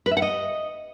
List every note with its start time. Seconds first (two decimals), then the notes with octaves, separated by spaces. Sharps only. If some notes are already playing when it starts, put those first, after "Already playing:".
0.06 B4
0.11 E5
0.17 F#5
0.22 D#5